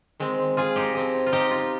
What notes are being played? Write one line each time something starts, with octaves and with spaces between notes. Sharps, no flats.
D#3 G#3 C4
F4 G#4
D#4 G4
F3 C4 D#4
F4
D#4 G4
F4